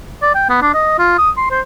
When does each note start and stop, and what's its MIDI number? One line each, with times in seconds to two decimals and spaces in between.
0.22 0.34 74
0.35 0.45 79
0.49 0.57 59
0.62 0.69 62
0.74 0.95 75
0.99 1.14 65
1.18 1.30 87
1.37 1.49 84
1.50 1.61 72